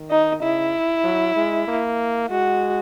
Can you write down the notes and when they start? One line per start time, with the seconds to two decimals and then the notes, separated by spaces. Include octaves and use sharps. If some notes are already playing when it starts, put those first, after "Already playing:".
Already playing: D#3
0.11 D#4
0.42 C#3 E4
1.04 F#3
1.36 G#3
1.68 A#3
2.30 G#3 F#4